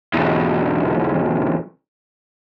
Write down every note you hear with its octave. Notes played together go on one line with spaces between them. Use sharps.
B1 E2